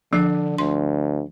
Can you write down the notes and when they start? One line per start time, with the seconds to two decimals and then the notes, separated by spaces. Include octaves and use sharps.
0.13 D3 F3 D4
0.58 D2 C6